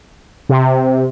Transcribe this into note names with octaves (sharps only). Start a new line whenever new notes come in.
C3